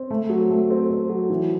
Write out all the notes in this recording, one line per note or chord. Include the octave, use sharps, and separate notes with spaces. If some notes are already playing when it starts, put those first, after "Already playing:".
Already playing: C4
A3
F#3
A3
C4
C4
F#3
E3